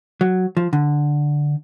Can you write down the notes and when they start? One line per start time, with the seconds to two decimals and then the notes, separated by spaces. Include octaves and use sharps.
0.21 F#3
0.57 F3
0.73 D3